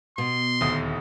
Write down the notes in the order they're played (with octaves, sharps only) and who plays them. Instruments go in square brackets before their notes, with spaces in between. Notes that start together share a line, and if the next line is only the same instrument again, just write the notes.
[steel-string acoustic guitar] B2 [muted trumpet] C6
[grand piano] D#1 D2 D#6